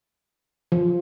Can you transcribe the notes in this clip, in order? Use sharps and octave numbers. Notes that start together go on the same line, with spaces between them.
F3